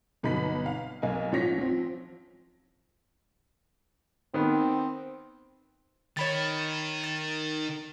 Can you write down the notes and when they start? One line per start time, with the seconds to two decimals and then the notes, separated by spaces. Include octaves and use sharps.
0.23 G1 B2 F#3 D#4 B5 B6
0.66 F5
1.02 B1 A#3 D#5 G#5
1.32 A1 F3 C#5 A#6 B6
1.58 F3 C4
4.34 D#3 B3 C4
6.17 D#3 C#5 B5 A6
7.04 A6